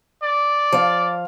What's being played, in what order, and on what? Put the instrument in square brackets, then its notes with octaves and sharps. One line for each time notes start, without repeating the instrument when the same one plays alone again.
[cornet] D5
[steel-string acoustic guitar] F3 F5